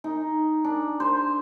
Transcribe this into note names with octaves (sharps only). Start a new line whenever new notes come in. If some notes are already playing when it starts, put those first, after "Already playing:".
D#4
D4
C5